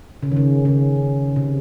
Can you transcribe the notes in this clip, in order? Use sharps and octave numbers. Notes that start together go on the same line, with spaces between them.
C#3
D#3
C#3
C#3
C3